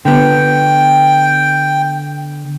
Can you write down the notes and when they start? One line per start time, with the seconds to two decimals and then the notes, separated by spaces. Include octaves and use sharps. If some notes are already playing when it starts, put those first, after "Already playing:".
0.05 D3 B3 G5